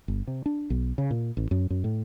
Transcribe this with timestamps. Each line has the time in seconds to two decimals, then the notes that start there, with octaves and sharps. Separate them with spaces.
0.08 G1
0.27 C3
0.46 D4
0.70 B1
0.98 C#3
1.11 A#2
1.37 A1
1.51 F#2
1.70 F#2
1.84 A2